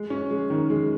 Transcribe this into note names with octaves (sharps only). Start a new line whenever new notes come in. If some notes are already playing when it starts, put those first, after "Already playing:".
Already playing: G#3
C#4
G#3
D#3
G#3